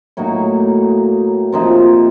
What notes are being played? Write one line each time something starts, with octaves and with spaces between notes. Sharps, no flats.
A2 F#3 A#3 D#4
C3 F3 A#3 D#4